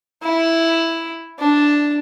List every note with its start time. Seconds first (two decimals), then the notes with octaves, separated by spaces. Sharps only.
0.23 E4
1.39 D4